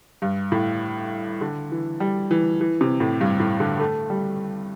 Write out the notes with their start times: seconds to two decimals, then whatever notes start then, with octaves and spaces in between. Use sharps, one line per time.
0.22 G2
0.52 A2
1.41 D3
1.72 E3
2.00 G3
2.31 E3
2.61 E3
2.81 C3
3.00 A2
3.21 G2
3.39 A2
3.60 D3
3.79 A3
4.10 G3